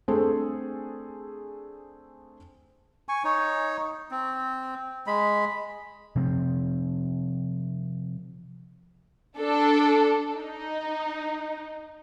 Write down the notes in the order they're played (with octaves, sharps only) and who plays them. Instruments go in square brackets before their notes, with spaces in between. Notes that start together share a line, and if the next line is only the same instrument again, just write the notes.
[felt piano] A3 C4 D4 G#4 A4
[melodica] G#5 C#6
D#4 C#5
C4
G#3 B5
[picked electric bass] C3 F3 C4
[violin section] D4 A4
D#4